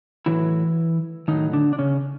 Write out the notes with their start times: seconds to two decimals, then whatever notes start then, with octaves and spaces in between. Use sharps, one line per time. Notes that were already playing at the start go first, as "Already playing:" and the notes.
0.26 A2 E3 F#3 E4
1.28 A2 D#3 F#3 D#4
1.53 D3 D4
1.73 D4
1.79 C#3 C#4